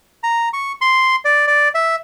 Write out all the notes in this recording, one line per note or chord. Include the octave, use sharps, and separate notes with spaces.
A#5
C#6
C6
D5
D5
E5